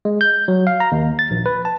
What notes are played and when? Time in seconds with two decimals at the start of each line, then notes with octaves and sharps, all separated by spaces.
0.05 G#3
0.21 G6
0.48 F#3
0.67 F5
0.80 A#5
0.92 D#2
1.19 A6
1.31 A#1
1.46 B4
1.65 A5